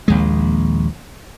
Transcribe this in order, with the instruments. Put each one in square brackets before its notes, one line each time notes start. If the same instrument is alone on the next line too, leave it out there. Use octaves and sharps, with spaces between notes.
[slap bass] A#1 D#2 G#3